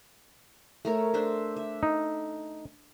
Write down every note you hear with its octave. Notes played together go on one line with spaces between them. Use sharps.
A3 A#4 C#5
D4 C5 E5
E5
D#4